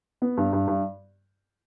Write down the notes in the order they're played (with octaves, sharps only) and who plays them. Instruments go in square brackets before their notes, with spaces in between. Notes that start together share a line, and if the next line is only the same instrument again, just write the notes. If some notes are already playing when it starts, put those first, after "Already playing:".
[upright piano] B3
G2
G2
G2